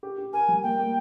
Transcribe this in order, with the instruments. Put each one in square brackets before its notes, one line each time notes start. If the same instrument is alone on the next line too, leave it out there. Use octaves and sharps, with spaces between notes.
[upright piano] G4
G4
[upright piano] A#4 [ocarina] G#5
[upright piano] G3
[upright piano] A#3 [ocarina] G5
[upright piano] A#3